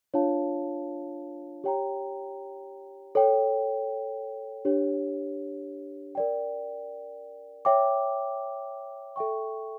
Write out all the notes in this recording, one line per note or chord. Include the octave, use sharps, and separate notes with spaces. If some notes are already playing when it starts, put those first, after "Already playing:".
D4 F4 C#5 F5 A5
G4 C#5 G5 A#5
A4 C#5 G5
D4 G4 C#5
A#4 D5 G5
C#5 E5 G5 D6
A4 E5 G5 C#6